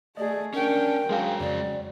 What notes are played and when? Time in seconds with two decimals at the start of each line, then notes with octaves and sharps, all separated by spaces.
0.17 A3 G#4 D5 D#5
0.54 C#4 D4 A#4 G5
1.10 F#3 G#3 F#4 G#4 F5 G5
1.40 F2 C#3 D5